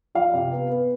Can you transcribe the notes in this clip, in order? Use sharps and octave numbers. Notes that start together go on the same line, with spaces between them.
F3 F5
C3
B3
B3